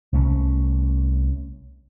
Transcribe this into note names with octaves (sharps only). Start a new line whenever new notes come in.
C2 A3 C#4